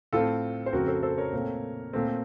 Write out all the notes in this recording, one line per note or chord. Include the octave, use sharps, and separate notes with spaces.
A2 A3 C4 F4 A4
C5
F2 C#3 A3 C4 F#4 A#4
A4 C5
A4 C5
A#4 C#5
A#2 A3 C4
A#2 A3 C4